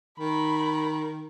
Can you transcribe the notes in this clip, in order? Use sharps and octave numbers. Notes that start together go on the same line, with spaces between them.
D#3 B5